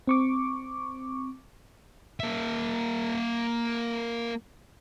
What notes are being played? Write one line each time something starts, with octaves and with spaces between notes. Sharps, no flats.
C4 C#6 D6
A#3 E5